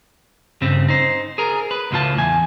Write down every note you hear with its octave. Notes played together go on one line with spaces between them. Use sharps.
G2 C#3 C4
D#4 C5
G#4 A#4
B4
C#2 A2 E3 F4 A5
E2 G#5